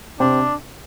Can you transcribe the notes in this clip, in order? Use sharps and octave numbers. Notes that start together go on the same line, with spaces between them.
C3 C4 D4